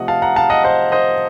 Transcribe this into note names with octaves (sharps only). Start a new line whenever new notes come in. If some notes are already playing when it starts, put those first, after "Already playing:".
Already playing: C3 F3 A3 D#5 F#5
F5 A5
F#5 A#5
F5 A5
D#5 F#5
C5 D#5
C5 D#5